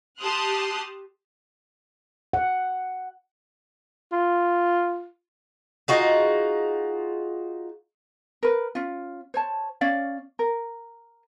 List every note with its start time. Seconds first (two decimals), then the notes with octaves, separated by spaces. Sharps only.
0.19 G4 A5 C6 D#6 F6 F#6
2.33 F#5
4.12 F4
5.88 D#4 F4 F#4 G#4
8.43 A#4 B4
8.75 C#4 F4
9.34 C5 C#5 A5
9.81 C#4 C#5 D5 F5
10.39 A#4